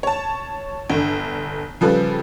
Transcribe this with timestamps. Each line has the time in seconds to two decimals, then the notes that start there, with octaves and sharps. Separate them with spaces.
0.03 C#5 A5
0.90 G1 D3
1.81 C#3 F3 G3 A4 B4